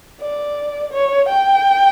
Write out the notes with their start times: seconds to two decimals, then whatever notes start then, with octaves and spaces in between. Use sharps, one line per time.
0.21 D5
0.93 C#5
1.29 G5